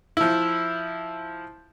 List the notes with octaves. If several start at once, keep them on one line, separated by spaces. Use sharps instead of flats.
F3 E4